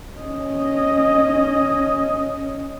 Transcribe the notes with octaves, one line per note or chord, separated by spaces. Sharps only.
C#4 D#5